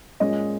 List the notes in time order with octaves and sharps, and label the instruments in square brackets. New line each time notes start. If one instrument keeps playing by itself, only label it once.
[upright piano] A#2 G#3 C#4 D#5